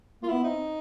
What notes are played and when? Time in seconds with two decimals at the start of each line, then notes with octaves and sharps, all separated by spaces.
0.22 A#3 F4
0.28 B3 E4
0.44 C4 D#4